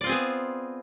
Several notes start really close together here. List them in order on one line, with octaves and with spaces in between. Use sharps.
D5 F4 C4 G#4 B3